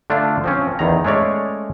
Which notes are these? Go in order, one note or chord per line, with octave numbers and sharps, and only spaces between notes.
D3 A3 D4 F4
F3 C4 C#4
E2 D#3 A#5
G#3 A3 C#4 C#5 D5